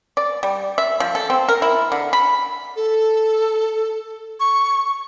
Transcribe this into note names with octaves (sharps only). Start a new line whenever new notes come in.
D5
G3
E5
F3
A4
C4
A#4
E4
D3
B5
A4
C#6